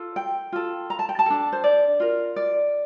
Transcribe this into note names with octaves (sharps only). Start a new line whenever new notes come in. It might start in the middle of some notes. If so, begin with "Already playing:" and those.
Already playing: F4 A4
G5
F4 A4
A#5
A5
G5
A5
D4 A4
C5
D5
F4 A#4
D5